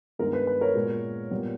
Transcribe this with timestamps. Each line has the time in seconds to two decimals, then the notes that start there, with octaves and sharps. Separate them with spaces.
0.19 G2 D#3 G#3 B3 A#4
0.33 B4
0.47 B4
0.61 A#4 C#5
0.75 A#2 G#3 B3
1.31 A#2 G3 B3